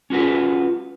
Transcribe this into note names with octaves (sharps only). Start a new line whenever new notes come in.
C#4 F4 F#4 B4